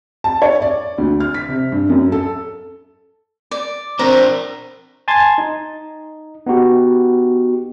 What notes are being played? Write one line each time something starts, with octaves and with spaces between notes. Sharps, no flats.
A5
C#5
D5
D2
F6
B6
C3
G2
F#2
A4
D5
C4 D4 A#4 A#5
G#5 A5 C6 G#6 A6
D#4
B3 D#4 F#4 G4